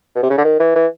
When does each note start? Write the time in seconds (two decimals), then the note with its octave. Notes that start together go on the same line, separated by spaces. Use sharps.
0.15 B2
0.23 C3
0.30 C#3
0.38 D3
0.44 D#3
0.59 E3
0.76 E3